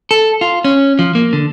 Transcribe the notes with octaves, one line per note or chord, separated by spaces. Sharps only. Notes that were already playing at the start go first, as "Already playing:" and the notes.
A4
F4
C#4
F3
A#3
D3